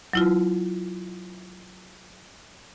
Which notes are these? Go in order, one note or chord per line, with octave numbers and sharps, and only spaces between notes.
F#3 E4 F4